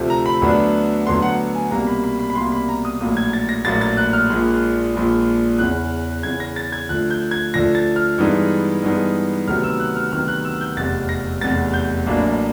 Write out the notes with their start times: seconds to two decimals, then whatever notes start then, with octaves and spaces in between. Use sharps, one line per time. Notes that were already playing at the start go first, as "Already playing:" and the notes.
Already playing: D2 C3 F3 A3 C4
0.10 A#5
0.26 B5
0.42 D2 D3 F#3 B3 D4
1.06 D2 D3 F#3 B3 D4 C6
1.22 F#5
1.55 G#5
1.71 C2 B2 G3 A#3 A#5
1.87 B5
2.04 B5
2.19 B5
2.30 B5
2.35 C2 B2 G3 A#3 C6
2.52 B5
2.69 A#5
2.85 D#6
3.00 A#1 A2 F#3 A#3 D#6
3.17 G#6
3.33 A6
3.49 A#6
3.65 A#1 A2 F#3 A#3 A6
3.81 A6
3.97 F#6
4.13 F6
4.30 A#1 A#2 F3 G#3
4.94 A#1 A#2 F3 G#3
5.59 E2 C#3 E3 F#6
6.23 E2 C#3 E3 G#6
6.40 A#6
6.56 A6
6.72 G#6
6.89 D2 D3 F3 F#6
7.10 G6
7.31 G#6
7.54 D2 D3 F3 A#6
7.75 A6
7.96 F6
8.18 G2 E3 G#3 B3 D#4
8.83 G2 E3 G#3 B3 D#4
9.47 D2 C3 D#3 F#3 B3 F6
9.64 E6
9.80 F#6
9.96 F6
10.12 D2 C3 D#3 F#3 B3 F6
10.28 F#6
10.45 E6
10.61 G6
10.76 F1 E2 C3 A6
11.09 A#6
11.41 F1 E2 C3 A6
11.74 G6
12.06 A1 A2 F#3 A#3 D4